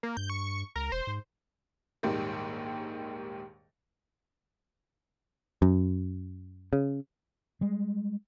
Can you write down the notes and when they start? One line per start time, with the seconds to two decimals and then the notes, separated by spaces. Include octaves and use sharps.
0.03 A#3
0.17 G2 G6
0.30 C#6
0.75 C#2 A#4
0.92 E1 C5
1.07 G#2
2.03 A#1 D#2 G#2 D#3 G3
5.62 F#2
6.73 C#3
7.61 G3 G#3